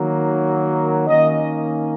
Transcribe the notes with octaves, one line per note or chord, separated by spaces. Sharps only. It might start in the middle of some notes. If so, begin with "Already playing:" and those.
Already playing: D#3 F#3 A#3
D#3 A#3 C#4 D#5